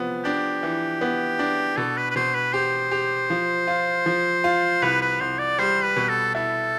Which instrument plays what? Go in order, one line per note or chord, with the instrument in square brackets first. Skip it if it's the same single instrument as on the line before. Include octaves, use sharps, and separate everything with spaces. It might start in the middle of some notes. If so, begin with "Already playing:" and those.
Already playing: [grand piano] C3 F3 B3
[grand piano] D4 [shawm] G4
[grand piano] E3
B3
D4
[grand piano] B2 [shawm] A4
[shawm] B4
B4
[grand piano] B2 [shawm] C5
[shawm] B4
[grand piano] G4 [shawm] C5
[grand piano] G4
F3
F4
F3
F4
[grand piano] C2 [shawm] B4
[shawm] B4
[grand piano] C2 [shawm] C5
[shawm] D5
[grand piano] G3 [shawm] C5
[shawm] B4
[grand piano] B2
[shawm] A4
[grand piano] E4 [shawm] A4